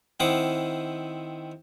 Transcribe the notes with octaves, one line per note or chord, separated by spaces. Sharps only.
D#3 C4 E4 F#5 D6 D#6